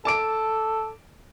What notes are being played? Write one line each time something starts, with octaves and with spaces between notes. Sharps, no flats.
A4 A5 D6 D7